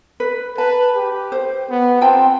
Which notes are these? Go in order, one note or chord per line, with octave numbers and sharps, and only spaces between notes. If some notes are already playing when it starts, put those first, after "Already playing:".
B4
B4 A5
G4
C5
B3
C4 F4 G5 A5